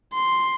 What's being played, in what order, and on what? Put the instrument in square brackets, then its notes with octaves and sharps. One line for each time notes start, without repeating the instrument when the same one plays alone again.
[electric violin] C6